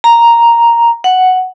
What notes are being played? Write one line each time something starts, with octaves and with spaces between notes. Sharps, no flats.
A#5
F#5